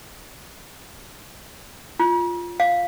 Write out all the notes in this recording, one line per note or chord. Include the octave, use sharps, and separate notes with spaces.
F4
F5